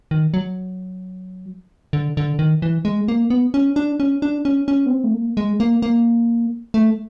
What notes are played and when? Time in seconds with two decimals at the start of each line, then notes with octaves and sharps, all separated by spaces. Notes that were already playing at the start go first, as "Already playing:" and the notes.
0.11 D#3
0.34 F#3
1.93 D3
2.17 D3
2.39 D#3
2.62 E3
2.85 G#3
3.08 A#3
3.30 B3
3.54 C#4
3.76 D4
4.00 C#4
4.22 D4
4.45 C#4
4.68 C#4
4.86 B3
4.91 C4
5.04 A3
5.14 A#3
5.37 G#3
5.60 A#3
5.82 A#3
6.74 A3